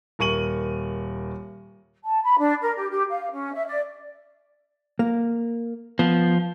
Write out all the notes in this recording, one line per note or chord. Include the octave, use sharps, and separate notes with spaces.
D#1 A#4 C#6 D#7 F#7
A5
B5
D4
A#4
G4
G4
F5
C#4
E5
D5
A#3
F3 B3